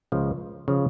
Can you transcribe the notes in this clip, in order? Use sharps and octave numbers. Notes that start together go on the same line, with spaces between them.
C#2 C#3 F3
C#3 F3